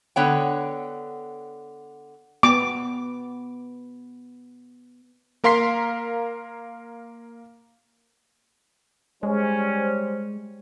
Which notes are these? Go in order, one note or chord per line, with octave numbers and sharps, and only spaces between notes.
D3 B3 C#5 G5
B3 D6
A#3 A#4 F5 C6 B6 C7
G3 G#3 C#4 C5